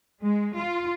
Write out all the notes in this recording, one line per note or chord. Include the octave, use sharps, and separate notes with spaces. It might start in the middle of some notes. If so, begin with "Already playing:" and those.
G#3
F4